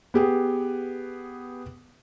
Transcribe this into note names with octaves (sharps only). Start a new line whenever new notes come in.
B3 G4 G#4